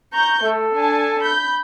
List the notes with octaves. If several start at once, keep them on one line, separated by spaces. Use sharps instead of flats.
A#5 C#6 G6
A3 A4
D4 G#5 A5
B5 G6